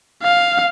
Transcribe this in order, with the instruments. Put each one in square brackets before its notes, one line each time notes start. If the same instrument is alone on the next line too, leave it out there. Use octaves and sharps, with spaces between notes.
[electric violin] F5